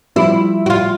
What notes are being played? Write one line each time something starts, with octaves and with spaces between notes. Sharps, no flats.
F3 G3 E4
F#4
F4